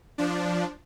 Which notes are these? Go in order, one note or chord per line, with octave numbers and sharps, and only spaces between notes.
F3 D4